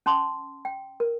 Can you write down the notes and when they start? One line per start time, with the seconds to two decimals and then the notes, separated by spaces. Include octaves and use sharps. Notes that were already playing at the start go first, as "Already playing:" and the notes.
0.06 C#4 A5 C6 D#6
0.65 G5
1.00 A#4